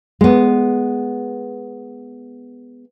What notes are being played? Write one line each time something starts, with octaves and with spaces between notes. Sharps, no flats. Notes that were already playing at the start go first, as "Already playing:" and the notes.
G#3 B3